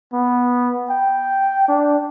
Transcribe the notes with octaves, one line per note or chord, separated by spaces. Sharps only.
B3
G5
D4